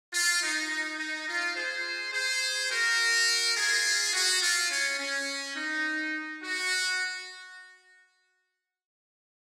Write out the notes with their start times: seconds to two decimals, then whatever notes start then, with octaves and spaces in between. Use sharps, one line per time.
0.14 F4
0.42 D#4
0.70 D#4
0.99 D#4
1.27 F4
1.56 G#4 C5
2.13 G#4 C5
2.70 F#4 A#4
3.56 F4 G#4
4.14 F#4
4.43 F4
4.71 C#4
5.00 C#4
5.56 D#4
6.43 F#4